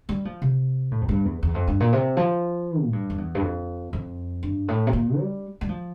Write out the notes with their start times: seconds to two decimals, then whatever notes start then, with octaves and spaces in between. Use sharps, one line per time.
0.09 G3
0.25 F3
0.42 C3
0.91 A2
1.01 F2
1.09 G2
1.25 E2
1.43 E2
1.54 F2
1.67 G2
1.80 A#2
1.92 C3
2.17 F3
2.84 A2
2.93 G2
3.10 F2
3.18 E2
3.35 G2
3.42 F2
3.93 F2
4.43 G2
4.68 A2
4.87 C3
4.93 A#2
5.19 G3
5.61 G3
5.69 F3